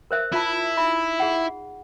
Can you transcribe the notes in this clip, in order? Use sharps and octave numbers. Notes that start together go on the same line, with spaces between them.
A#4 C5 E5
E4 F4 E5 A5
D#4 E5 B5
G#4 F#5